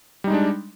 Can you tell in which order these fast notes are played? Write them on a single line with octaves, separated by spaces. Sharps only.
G3 D#4 G#3 D4